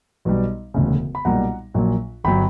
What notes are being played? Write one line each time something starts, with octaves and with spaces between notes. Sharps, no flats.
B1 B2 G3
E1 D2 C#3
B5
B1 A#2 G3 F#5 A#5
A#1 A#2 F#3
G1 F#3 G5 B5